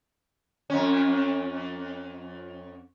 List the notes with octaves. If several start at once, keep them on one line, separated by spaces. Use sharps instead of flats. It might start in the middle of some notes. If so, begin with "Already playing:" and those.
F2 C#4